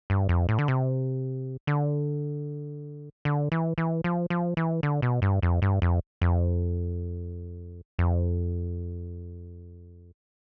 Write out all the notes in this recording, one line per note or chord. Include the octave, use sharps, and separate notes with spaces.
G2
F2
A2
D3
C3
D3
D3
E3
E3
F3
F3
E3
D3
B2
G2
F2
G2
F2
F2
F2